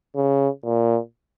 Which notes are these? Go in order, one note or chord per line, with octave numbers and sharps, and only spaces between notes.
C#3
A#2